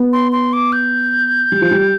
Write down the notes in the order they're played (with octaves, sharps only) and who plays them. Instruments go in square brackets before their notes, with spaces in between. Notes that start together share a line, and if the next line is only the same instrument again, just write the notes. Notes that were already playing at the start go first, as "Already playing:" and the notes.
Already playing: [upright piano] B3
[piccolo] C6
C6
D6
G6
[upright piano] G3
F3
G3